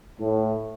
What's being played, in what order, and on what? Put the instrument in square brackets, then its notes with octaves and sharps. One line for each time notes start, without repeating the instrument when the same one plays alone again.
[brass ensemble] A2